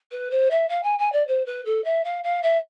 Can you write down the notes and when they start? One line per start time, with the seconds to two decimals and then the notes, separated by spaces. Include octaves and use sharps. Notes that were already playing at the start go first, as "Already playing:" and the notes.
0.11 B4
0.31 C5
0.51 E5
0.69 F5
0.83 G#5
0.99 G#5
1.12 D5
1.27 C5
1.46 B4
1.65 A4
1.84 E5
2.04 F5
2.24 F5
2.43 E5